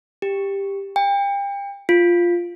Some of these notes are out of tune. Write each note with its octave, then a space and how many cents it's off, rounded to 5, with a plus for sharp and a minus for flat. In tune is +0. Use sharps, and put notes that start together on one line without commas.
G4 +10
G5 +35
F4 +0